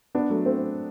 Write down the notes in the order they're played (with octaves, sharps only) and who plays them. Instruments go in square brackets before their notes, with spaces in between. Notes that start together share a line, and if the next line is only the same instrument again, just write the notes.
[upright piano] B3 D4
F#3 A3
A3 C4